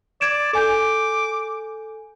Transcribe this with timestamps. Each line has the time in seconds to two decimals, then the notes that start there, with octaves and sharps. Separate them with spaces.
0.21 D5 G#6 D7 E7
0.53 A4 G#5 D6 G6